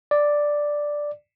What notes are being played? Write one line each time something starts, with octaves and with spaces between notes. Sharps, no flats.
D5